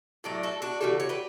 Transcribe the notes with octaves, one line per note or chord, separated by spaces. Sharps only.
A2 F#3 A3 D5
F#4 A4
D4 F#4
C#3 E3 G3 F#4 A4
C#5
G4 B4